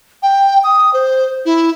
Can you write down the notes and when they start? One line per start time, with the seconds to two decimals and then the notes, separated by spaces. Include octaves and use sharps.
0.23 G5
0.64 D#6
0.93 C5
1.45 E4